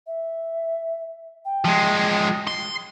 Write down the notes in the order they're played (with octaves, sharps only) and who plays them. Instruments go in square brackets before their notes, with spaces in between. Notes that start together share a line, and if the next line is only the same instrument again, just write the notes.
[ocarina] E5
G5
[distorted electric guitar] F3 G#3
C6